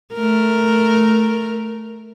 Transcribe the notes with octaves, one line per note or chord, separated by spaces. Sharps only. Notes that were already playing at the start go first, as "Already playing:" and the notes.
A3 A#4